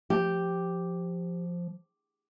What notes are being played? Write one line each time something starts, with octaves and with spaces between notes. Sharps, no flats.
F3 G4